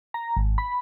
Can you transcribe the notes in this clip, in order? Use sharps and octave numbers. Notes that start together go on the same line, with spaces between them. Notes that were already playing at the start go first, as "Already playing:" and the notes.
A#5
G#1
B5